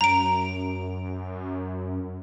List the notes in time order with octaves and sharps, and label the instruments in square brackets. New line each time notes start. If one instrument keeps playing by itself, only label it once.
[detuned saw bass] F#2 [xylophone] A#5 D7